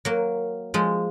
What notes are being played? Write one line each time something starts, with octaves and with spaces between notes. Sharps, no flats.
F#3 A#3
F3 G#3